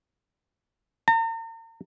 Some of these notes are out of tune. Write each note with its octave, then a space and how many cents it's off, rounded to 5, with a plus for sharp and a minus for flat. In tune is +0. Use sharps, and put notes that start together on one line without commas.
A#5 -40